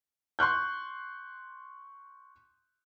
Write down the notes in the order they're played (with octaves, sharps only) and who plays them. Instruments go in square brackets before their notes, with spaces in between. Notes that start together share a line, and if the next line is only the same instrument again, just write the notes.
[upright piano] C6 C#6 F#6 G6